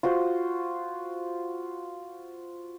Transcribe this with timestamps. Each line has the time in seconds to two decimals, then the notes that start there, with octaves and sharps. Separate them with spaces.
0.03 F4 F#4 C5